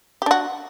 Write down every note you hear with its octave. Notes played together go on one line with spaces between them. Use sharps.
D4 F#4 G4